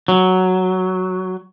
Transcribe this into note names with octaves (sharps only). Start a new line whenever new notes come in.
F#3